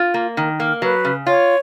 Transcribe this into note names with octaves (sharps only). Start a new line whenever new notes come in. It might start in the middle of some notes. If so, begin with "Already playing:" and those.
Already playing: F4
A#3
D#3
A#3
F#3 B4
C#3
F4 C#5